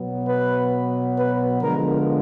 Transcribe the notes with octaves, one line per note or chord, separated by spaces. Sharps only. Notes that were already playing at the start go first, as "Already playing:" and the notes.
Already playing: B2 F#3 B3
B4
B4
D3 F3 G#3 B3 A#4